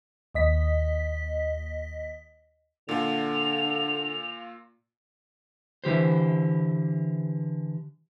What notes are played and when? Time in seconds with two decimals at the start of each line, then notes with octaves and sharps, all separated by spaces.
0.35 D#2 D#5 B6
2.89 A#2 D3 F4 F7
5.84 D3 E3 G4 C5